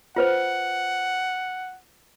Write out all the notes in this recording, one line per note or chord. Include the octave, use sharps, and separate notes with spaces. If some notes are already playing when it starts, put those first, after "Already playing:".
F4 B4 C5 F#5